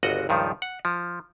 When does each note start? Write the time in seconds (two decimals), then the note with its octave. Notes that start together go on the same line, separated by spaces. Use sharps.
0.03 G1 C#2 F#4 D#5 F#5
0.29 C#2 G2 D#3 F3
0.62 F#5
0.85 F3